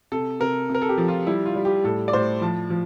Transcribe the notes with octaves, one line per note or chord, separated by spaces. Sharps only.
C3 A4
C3 A#4
C3
A#4
A4
G4
F3
F4
G3 E4
F4
G3
G4
A2 A4
D5
A2 C5
F3 A5
F3